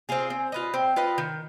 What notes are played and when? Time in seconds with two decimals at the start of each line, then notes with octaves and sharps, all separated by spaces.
0.09 C4 F4 G#4
0.30 C4 G#5
0.52 F4 B4 D#5
0.74 C4 G5
0.96 F4 B4 D#5
1.18 D#3